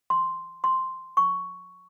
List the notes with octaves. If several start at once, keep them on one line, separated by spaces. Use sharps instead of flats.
C6
C6
C#6